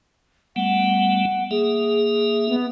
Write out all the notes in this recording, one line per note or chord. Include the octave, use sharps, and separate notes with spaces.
G3 A3 B3 F#5
A#3 G#4 E5
B3